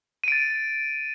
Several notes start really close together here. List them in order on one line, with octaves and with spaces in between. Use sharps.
D#7 D7 A6